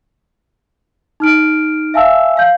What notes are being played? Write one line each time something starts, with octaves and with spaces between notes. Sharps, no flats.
D#4 F6 D7
E5 F5 G#5 A5 E6
F5 G6